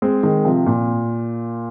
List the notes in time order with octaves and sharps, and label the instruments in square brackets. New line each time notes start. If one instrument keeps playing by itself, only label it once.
[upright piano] G#3 C4
D#3 G#3
C3 F3
A#2